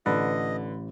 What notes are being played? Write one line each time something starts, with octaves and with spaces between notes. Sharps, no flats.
A1 D3 B4 D#5